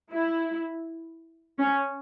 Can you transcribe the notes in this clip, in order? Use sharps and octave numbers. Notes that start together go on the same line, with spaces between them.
E4
C#4